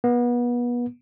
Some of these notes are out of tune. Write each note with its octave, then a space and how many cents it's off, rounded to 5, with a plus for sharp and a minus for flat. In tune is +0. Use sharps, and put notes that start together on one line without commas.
B3 -30